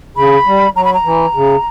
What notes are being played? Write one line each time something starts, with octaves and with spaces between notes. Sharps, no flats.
C#3 B5
G3
F#3 A#5
B5
A#5
E3
C#3